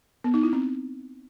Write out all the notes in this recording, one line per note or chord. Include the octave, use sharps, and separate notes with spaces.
B3
D#4
E4
C4